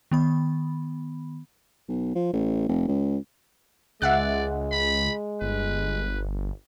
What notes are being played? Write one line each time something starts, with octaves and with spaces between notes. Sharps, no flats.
D#3 B3 B5
B1
F3
A1
F1
C#2
C#2 G#3 D5 E5 F#5 F#6
B5
G1 B4